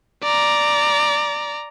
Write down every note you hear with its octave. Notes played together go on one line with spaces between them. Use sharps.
D5 A#5